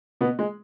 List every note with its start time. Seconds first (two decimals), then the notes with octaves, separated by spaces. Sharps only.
0.21 B2 B3
0.39 G#3